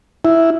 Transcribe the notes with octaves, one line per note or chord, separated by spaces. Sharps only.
E4